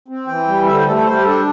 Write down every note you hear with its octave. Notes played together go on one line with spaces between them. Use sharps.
C4
E3 G5
G3
D3 E5
C5
A3 A4
A4
G3 C5
G4
D4 A4